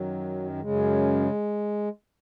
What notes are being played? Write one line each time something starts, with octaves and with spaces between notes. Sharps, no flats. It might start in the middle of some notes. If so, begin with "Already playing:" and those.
Already playing: F#2 D#3 F#3
F#2 C#3 G#3